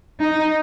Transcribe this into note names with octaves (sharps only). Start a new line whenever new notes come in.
D#4